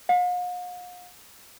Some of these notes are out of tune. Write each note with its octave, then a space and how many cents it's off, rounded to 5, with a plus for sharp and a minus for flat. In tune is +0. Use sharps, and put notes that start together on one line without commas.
F5 +45